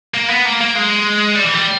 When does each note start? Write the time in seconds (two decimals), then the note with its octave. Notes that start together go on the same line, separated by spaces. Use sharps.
0.14 A#3
0.30 B3
0.45 A#3
0.61 A#3
0.75 G#3
1.36 G3
1.45 E3
1.54 G3